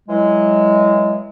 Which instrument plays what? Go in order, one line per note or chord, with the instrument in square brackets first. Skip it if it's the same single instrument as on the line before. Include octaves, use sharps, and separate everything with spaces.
[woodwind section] E3 F#3 G#3